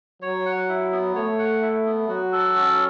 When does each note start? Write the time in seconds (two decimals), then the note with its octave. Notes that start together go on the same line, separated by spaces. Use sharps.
0.22 F#3 C#5
0.46 F#5
0.69 E4
0.92 B3
1.15 A3 C#5
1.39 F#5
1.62 E4
1.86 B3
2.08 F#3 F#4
2.32 A4
2.56 C#4